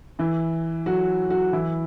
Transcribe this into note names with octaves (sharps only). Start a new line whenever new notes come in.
E3 E4
F#3 F#4
F#3 F#4
E3 E4